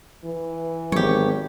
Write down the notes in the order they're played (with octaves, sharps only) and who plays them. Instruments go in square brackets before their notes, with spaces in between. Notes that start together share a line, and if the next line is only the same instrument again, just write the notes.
[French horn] E3
[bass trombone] G#1 [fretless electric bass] F#3 B3 [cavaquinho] G4 C#5